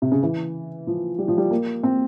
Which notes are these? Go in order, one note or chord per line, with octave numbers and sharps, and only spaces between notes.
C3
C#3
E3
F3
G3
F3
G3
A#3
C4